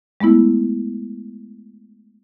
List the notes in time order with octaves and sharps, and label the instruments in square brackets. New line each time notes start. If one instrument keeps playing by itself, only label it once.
[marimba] G#3 A3 B3 E4